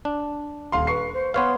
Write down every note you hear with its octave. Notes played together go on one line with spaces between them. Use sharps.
D4
D#1 F5 C6
B4 C#6 C7
C5
B3 B4 C#5 F5 C6